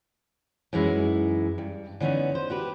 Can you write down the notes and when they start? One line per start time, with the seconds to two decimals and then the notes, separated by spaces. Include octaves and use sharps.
0.73 F#2 E3 G#3 D#4 E4
1.58 G2
2.00 D3 E3 B3 C#4 D#4
2.35 C5
2.50 F#4 G4 B4